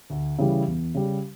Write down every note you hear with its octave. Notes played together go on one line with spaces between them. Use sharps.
D2
C#3 E3 G3
E2
C#3 G3